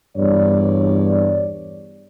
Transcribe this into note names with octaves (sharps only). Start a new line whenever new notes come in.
E2 G2 C#5 D5